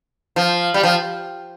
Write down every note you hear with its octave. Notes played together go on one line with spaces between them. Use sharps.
F3
G3
F3